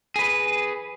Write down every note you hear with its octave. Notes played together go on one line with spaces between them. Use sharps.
G#4 B4